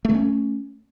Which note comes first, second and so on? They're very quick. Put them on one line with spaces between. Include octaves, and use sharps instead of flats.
A3 A#3 C#4